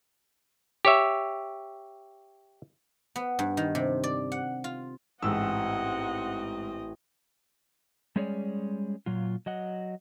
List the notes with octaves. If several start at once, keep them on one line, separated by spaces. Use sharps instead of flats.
G4 C#5 E5
B3
G2
D#3
C3
D5
F#5
F4
A1 G#2 C4 D#5 F#5 E6
G3 G#3 C#4 G#4 C#5 D5
A#2 F#3 F4
F#3 D#5 F#5